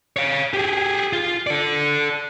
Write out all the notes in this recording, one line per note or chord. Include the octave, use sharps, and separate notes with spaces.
C#5 F5
G4 G#4
F4
A4 D5